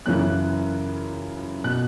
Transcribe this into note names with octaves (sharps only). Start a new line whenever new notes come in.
F#2 C#3 E3 F#6
B2 F#6